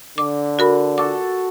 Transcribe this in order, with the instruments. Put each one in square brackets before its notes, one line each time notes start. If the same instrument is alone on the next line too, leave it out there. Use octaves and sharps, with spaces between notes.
[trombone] D3 [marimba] D6
[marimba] F#4 A#4 B5
[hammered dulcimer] F#4 A4 [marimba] D6